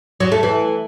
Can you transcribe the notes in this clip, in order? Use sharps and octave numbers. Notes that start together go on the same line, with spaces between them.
F#3
A3
E3